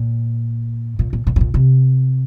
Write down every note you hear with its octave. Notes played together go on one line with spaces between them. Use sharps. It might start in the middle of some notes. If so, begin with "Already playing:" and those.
Already playing: A#2
A#2
A#2
A#2
G2
A#2
C3